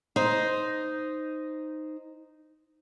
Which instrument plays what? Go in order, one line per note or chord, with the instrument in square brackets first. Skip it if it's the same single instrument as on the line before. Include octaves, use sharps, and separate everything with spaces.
[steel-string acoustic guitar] D#4 C5